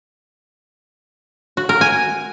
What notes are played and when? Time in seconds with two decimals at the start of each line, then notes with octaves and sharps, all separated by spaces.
1.57 F#4
1.69 A#4
1.81 G#5